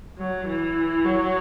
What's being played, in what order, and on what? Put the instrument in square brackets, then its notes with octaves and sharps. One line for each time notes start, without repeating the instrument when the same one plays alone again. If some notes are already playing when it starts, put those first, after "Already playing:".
[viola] F#3
E3
F#3